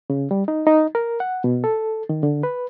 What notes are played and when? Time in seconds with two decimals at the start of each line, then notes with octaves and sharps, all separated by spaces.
0.10 C#3
0.31 G3
0.48 D#4
0.66 D#4
0.95 A#4
1.20 F#5
1.44 B2
1.64 A4
2.09 D#3
2.23 D3
2.43 B4